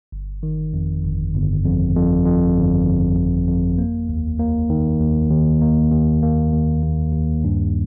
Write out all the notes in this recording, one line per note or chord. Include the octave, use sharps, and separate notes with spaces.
G1
D#3
F2
G1
G1
F2
F2
F2
G1
G1
G1
F2
A#3
D#2
A#3
D#3
D#2
D#2
A#3
D#2
A#3
D#2
D#2
D#2
G2